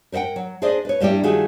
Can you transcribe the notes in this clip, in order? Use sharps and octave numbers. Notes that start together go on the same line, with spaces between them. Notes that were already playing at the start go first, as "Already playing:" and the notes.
A#4 C5 D#5 F#5 G5
F#3
D4 G#4 C5 D5 D#5
B4 C#5
G2 G3 D4 E4 G4
D#3 G3 A3 F4 F#4 G#4